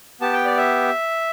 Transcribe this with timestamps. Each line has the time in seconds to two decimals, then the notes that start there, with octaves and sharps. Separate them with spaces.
0.21 B3 G4 A5
0.33 G5
0.45 D5
0.57 E5